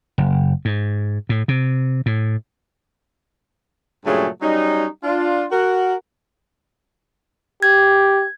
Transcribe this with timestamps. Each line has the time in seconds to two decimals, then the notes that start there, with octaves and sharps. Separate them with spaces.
0.18 F#1
0.65 G#2
1.29 A2
1.48 C3
2.06 A2
4.06 G2 A#2 C#3 F#3 A3 G#4
4.42 F#3 G3 C#4 D#4
5.04 D4 F4
5.52 F#4 A#4 F#5
7.63 G4 G#6